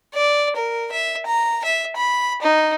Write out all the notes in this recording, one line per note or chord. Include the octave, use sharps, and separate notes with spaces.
D5
A#4
E5
A#5
E5
B5
D#4